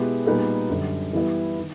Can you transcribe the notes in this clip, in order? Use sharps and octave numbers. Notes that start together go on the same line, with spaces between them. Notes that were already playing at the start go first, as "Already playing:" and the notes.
Already playing: B2 G#3 B3 E4 G4
A#2 G3 B3 D#4 G#4
F#2 D3 G3
E3 G3 B3 E4
D#3